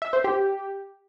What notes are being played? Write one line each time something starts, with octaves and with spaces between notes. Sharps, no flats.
E5
C5
G4